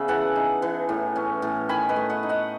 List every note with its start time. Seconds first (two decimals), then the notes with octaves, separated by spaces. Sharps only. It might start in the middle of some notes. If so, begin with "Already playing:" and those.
Already playing: C#3 B3 E5
0.08 E3 F#5 A5
0.36 D#4
0.62 E3
0.89 A2
1.16 C#4
1.42 A2
1.69 D#3 G#5 B5
1.89 B4 D#5
1.96 A3
2.10 D#5 F#5
2.23 D#4
2.29 D#5 F#5